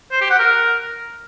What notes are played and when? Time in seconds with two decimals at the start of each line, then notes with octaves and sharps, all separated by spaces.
0.12 C5
0.21 G4
0.30 F#5
0.39 A#4